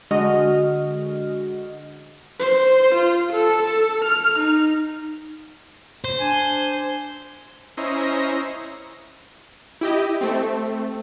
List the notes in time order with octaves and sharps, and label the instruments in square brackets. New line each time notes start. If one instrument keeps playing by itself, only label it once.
[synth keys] D3 G#3 F#4 D#5 F6
[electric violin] C5
F4
A4
A4
F6
D#4
[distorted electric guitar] C5
[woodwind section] D4 G#5
[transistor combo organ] C#4 E4 C5 D#5 A#5
[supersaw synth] E4 G4 D#5
A3 C4